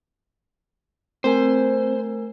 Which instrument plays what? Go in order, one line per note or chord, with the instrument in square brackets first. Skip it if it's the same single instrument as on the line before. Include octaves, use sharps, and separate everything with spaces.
[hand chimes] A3 A#4 G#5 [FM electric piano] C4 [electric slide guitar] C5